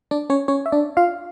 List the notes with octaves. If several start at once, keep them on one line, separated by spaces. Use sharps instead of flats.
D4 D5
C#4 C#5
C#4 C#5
E5
D4 D5
F4 F5